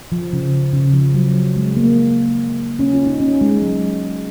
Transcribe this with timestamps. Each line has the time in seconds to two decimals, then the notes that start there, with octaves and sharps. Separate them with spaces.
0.12 F3
0.33 C#3
0.73 C#3
0.93 F3
1.14 F#3
1.56 G#3
1.77 A#3
2.79 C#4
2.93 F4
3.07 D#4
3.20 C#4
3.41 G#3
3.62 F#3